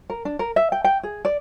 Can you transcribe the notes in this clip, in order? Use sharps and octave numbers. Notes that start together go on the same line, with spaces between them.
A#4
D4
A#4
E5
G5
G5
G#4
D5